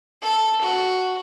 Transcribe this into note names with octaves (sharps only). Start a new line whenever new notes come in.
A4
F#4